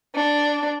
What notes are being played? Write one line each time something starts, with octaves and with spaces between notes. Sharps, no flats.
D4